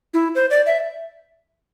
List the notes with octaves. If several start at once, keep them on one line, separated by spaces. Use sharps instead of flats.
E4
C5
D5
E5